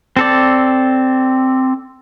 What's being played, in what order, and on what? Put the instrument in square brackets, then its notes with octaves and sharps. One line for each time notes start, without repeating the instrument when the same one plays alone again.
[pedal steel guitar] C4 A4 D5